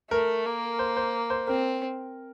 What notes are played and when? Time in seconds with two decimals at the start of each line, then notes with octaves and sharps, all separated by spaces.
0.11 A3 A#4
0.45 A#3
0.79 C5
0.97 C5
1.30 C5
1.48 C4 A#4